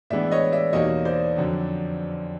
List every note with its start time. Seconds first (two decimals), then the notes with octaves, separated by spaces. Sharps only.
0.10 A2 E3 G#3 B3 D4 D5 E5
0.31 C#5 D#5
0.52 D5 E5
0.73 E2 B2 G3 A#3 D#4 C#5 D#5
1.05 C5 D5
1.36 F2 D3 F#3